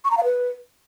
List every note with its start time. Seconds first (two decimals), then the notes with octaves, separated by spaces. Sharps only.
0.04 C#6
0.11 A#5
0.17 F5
0.24 B4